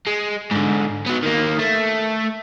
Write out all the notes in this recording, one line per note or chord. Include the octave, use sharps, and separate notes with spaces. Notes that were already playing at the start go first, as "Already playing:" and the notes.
G#3
G#2 D3
F#3 B3
D#3 A#3
A3